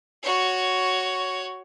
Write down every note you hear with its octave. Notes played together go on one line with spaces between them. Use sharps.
F#4 C#5